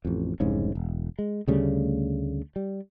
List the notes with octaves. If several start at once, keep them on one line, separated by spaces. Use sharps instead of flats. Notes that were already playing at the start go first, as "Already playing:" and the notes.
A1 F2
F1 C2 G#2 C#3
E1
G#3
D2 C#3 G3 A3
G3